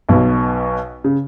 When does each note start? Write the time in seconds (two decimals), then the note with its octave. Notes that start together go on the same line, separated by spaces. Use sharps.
0.09 B1 B2
1.04 C#3